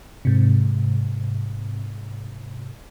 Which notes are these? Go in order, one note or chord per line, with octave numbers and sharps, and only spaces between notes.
G#2 C3